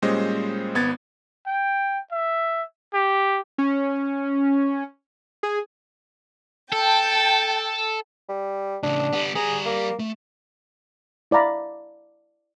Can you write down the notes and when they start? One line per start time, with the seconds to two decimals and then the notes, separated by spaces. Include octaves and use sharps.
0.02 A#2 G3 G#3 C#4 C5 D#5
0.75 G#1 B3 G#6 A6
1.47 G5
2.12 E5
2.94 G4
3.58 C#4
5.43 G#4
6.72 A4 G5 A5
8.29 G3
8.83 A2 C#3 D4
9.13 G3 B3
9.35 G3 G#4 A#5
9.66 A#3
9.99 A3
11.31 E4 D5 F5 A#5 B5